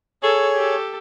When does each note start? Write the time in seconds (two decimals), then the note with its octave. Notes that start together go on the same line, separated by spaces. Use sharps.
0.23 G#4 A4 C#5
0.54 G4 A4